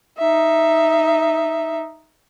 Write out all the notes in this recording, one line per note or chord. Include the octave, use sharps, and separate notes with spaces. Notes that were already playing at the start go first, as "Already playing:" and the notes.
D#4 E5